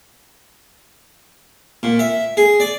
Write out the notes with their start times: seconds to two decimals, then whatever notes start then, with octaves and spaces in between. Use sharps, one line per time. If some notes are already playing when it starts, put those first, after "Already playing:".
1.83 A#2
1.99 E5
2.37 G#4
2.60 D5